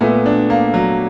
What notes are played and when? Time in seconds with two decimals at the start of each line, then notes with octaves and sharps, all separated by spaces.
0.01 A#2 A3 B3
0.26 D4
0.50 A#3
0.74 F#3